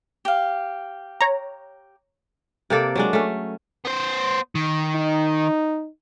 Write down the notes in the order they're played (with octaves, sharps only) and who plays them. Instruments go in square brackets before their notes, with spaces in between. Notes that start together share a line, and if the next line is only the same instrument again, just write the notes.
[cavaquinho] G4 F5
[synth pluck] C#5 A#5
[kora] C3 A#3 A4 D5
F#3 G#3 D4
A3 C#4
[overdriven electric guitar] B3 C5
D#3
[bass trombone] D#4